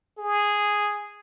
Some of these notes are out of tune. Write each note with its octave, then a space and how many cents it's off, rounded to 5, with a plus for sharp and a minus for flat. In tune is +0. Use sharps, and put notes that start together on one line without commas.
G#4 -5